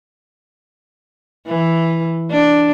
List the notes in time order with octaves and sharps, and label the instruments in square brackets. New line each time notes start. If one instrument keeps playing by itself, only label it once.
[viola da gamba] E3
D4